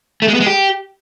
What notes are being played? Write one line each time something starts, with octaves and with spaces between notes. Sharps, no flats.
A3
G#3
B3
G#3
G4